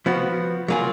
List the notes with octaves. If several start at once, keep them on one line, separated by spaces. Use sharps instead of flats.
F3 B3 F#4
F#3 A#3 F4 G#4